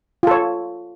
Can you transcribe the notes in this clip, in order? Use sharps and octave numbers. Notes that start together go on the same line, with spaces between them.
F4 A4 C#5